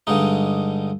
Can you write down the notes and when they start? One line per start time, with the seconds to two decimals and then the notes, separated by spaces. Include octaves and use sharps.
0.07 G2 D3 G#3 D#4